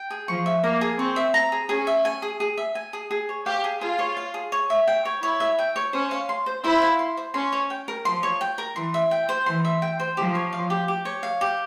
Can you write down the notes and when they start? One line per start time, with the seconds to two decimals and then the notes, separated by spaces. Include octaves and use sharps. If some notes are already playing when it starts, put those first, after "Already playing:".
Already playing: G5
0.10 G#4
0.28 F3 C#6
0.46 E5
0.63 A#3 A#5
0.81 G#4
0.98 C4 C#6
1.16 E5
1.34 A#5
1.52 G#4
1.69 C#4 G#4
1.87 E5
2.05 G#5
2.22 G#4
2.40 G#4
2.57 E5
2.75 G#5
2.93 G#4
3.11 G#4
3.29 C#5
3.46 G4 F5
3.64 G#4
3.81 F4 G#4
3.99 C#5
4.17 F5
4.34 G#4
4.52 C#5
4.70 E5
4.88 G5
5.05 C#5
5.22 E4 C#5
5.40 E5
5.59 G5
5.76 C#5
5.93 C#4 C5
6.11 F5
6.29 C6
6.46 C5
6.64 E4 C5
6.82 F5
6.99 C6
7.17 C5
7.34 C#4 C6
7.53 C#5
7.70 G5
7.88 A#4
8.05 F3 C6
8.23 C#5
8.41 G5
8.58 A#4
8.76 E3 C6
8.94 E5
9.11 G5
9.29 C5
9.46 E3 C6
9.65 E5
9.82 G5
10.00 C5
10.17 F3 G4
10.35 C#5
10.53 F5
10.70 G4
10.88 G4
11.05 C#5
11.23 F5
11.41 G4